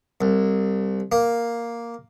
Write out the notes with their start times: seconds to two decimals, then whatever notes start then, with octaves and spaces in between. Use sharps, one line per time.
0.21 C2
1.12 A#3